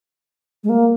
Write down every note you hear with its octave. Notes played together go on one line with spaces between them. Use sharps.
G#3
A#3